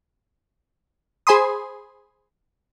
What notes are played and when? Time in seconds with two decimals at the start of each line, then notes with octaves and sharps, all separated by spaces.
1.27 G#4 C5 G#5 B5 C6 D#6